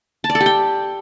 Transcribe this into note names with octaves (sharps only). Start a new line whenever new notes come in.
A5
D5
A4
G4
G5